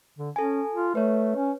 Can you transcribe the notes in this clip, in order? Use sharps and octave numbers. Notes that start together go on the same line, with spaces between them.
D3
C#4 A4 G#5
F4
A3 B4 C#5
C#4